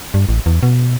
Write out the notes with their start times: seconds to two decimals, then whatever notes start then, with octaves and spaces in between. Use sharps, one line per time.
0.14 G2
0.29 A1
0.46 E2
0.63 B2